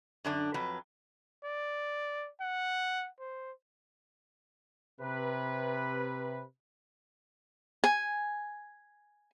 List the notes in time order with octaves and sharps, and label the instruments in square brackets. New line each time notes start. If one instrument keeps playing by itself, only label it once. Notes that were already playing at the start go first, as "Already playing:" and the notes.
[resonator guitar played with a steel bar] F#2 D3 D4
F2 F#3 B4
[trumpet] D5
F#5
C5
[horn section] C3 B4
[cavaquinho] G#5